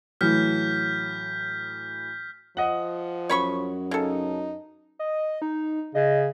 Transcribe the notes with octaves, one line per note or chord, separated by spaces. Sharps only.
A2 E3 F#3 F6 G6 B6
F3 D#5 F#5
F#2 C#5 B5 C#6
C#3 D#4 A4
D#5
D#4
C#3 D#5